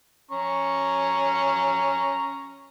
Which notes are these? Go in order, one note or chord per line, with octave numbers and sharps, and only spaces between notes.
C#4 A#5 C#6